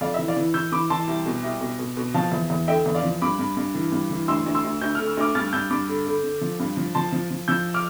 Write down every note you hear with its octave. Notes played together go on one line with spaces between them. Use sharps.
F2 D5 F5
E5
E3
D5 F5
E3
E3 E6 G6
E3 B5 D6
E3 A5 C6
C2
B2
C2
B2
B2
B2
F3 F5 A5
E2
E2
D3 E5 G5
E2
D5 F5
F3
G2 B5 D6
G2
G2
E3
G2
E3
D2 C6 E6
D2
C6 E6
D2
D2 G6
D3 F6
E6
D2 D6 F6
G2 F6 A6
G2 E6 G6
G2 B5 D6
D3
D3
D3
F3
G2
F3
F3 A5 C6
F3
F3
F3 E6 G6
D6 F6